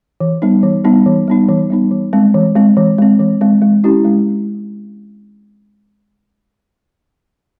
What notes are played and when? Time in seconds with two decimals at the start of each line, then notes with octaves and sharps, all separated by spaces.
0.21 E3
0.42 G3 B3 D#4
0.63 E3
0.84 G3 B3 D#4
1.06 E3
1.28 G3 B3 D#4
1.49 E3
1.70 G3 B3 D#4
1.91 E3
2.13 G#3 C4
2.34 E3
2.56 G#3 C4
2.77 E3
2.98 G#3 C4
3.20 E3
3.41 G#3 C4
3.62 G#3
3.84 C#4 E4 G4
4.05 G#3